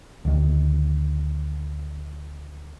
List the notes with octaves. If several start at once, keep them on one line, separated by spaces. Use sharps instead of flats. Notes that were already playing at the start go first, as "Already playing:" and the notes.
D2 D#3